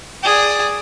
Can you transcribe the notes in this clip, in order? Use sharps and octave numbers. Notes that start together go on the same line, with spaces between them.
G#4 D5